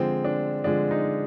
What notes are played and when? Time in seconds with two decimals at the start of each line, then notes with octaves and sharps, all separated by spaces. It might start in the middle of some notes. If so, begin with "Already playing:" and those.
Already playing: D3 F3 G#3 C4
0.25 D4
0.64 D3 F3 G#3 D4
0.91 D#4